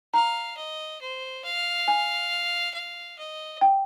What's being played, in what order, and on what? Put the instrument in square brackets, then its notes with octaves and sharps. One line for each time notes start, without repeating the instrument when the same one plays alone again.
[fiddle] F5 [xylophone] A#5
[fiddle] D#5
C5
F5
[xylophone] G#5
[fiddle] F5
D#5
[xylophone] G5